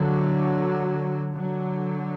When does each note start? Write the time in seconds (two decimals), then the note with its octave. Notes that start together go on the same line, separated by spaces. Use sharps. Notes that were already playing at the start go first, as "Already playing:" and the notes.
Already playing: D3 F#3
1.36 D3 F#3